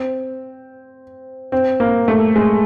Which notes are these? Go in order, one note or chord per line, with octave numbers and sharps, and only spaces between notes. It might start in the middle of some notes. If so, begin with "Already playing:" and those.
Already playing: C4
C4
A#3
A3
G#3